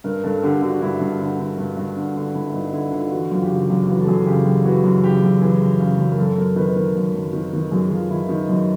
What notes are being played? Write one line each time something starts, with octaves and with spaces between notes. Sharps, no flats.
G2 A#4
G2 A4
D3 G4
D3 F#4
G2 E4
G2
D3
D3
G2
G2
D3
D3
G2 E4
G2 D#4
D3 E4
D3 F4
E3 F#4
F#2 F4
G4
C#3 F#4
F#2 G4
E3 F#4
A4
F#2 G#4
C#3 G4
F#2 G4
E3 F#4
F#2
C#3 G4
F#2
E3 G#4
F#2
C#3
F#2
A#4
F#2 A4
F#2 A#4
D#3 B4
B4
D#3 A#4
F#2
F#2
D#3
D#3
F#2 G#4
F#2 F4
D#3 E4
D#3 D#4
F#2